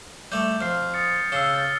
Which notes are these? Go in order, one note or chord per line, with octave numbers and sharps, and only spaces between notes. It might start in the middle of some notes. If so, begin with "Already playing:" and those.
G3 A3 G6
F2 F6 C7
D#6 A6 C#7
C#3 E6 C7 G7
G6 A6